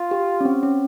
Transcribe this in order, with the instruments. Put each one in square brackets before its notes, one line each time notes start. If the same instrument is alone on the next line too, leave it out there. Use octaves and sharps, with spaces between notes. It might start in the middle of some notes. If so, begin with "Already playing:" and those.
Already playing: [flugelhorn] F4
[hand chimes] G4
C#4
C4
C#4